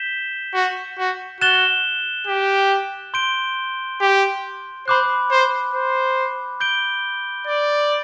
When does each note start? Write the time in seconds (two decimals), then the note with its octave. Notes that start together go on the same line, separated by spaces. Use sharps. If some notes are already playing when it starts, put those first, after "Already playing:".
Already playing: G6 B6 E7 G7
0.54 F#4
0.98 F#4
1.40 F#4 F#6 A6 E7 G7
2.27 G4
3.14 C6 G6 D7 G7
4.01 G4
4.87 C5 B5 D6 F#6
5.31 C5
5.74 C5
6.60 G6 D7 G7
7.47 D5